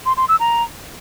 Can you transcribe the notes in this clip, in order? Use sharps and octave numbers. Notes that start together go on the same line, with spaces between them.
C6
C6
E6
A#5